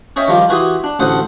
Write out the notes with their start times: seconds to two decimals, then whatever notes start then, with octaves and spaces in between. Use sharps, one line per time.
0.16 C#4 C#5 D#5 E5 G5
0.28 D#3 F3 G3 F4 G4
0.49 E3 F#4 G4 G#5 C6 D#6
0.84 D4
0.99 A1 D2 A4 C5 F#5 D#6